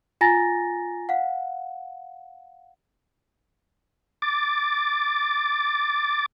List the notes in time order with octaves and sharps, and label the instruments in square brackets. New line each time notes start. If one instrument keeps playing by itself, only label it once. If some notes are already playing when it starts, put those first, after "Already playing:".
[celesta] F4 G#5 A#5 A6 A#6
F5 F#5
[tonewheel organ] D6 A6